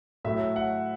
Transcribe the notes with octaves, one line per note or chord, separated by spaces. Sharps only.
A2 F#3 A3 E5
F#5